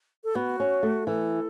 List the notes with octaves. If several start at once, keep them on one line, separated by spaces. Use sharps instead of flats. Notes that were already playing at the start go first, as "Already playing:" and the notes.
A4
B3 F#4
C#4
A3
E3 A4